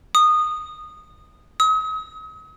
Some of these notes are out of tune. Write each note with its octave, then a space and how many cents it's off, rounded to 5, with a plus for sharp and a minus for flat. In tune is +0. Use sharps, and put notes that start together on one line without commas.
D#6 -15
D#6 +40